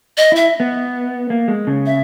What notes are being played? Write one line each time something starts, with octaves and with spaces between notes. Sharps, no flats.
D#5
E4 E5
B3
A#3
G#3
C#3
E5